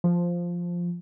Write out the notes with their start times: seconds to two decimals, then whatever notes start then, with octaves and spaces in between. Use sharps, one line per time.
0.04 F3